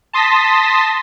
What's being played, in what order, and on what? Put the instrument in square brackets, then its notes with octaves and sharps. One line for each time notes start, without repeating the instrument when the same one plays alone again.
[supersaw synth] A5 C6 D#6 A#6 B6